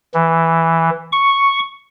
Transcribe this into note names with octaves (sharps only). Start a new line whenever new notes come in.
E3
C#6